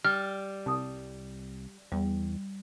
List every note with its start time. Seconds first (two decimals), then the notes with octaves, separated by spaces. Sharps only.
0.04 G3 F6
0.66 C2 A5 D#6
1.92 E2 G3